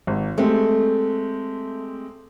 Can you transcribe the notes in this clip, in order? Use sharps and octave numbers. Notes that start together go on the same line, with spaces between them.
G#1
G#3 A3 C4 G4